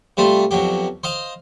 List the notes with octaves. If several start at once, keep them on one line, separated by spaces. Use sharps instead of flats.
C3 G3 A3 F4
F2 B2 F#3 G4
C5 D#5 F5